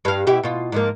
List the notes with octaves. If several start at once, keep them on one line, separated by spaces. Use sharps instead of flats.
G2 F5
B2 E4 G4
B2 F4
G#2 F3 A#3